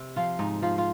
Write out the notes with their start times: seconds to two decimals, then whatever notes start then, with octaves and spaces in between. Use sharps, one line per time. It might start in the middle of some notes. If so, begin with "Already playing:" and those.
Already playing: C3
0.16 F3 F4
0.39 G#2 D#4
0.62 F3 F4
0.78 F4